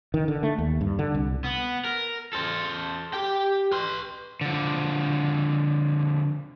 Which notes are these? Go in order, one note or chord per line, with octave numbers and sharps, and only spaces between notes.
D#3
D3
A3
D#2
G2
D3
C2
B3
A#4
A4 C5
G4 G5
B4 C6
D3 F3